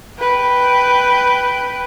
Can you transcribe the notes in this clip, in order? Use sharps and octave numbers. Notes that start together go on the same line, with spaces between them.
B4 G5